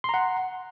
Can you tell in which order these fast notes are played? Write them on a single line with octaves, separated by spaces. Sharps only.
C6 A#5 F#5